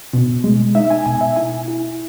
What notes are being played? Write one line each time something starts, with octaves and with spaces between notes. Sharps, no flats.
B2
G#3
D#4 E5
G#5
B2 G#5
E5
E4 G#5
E4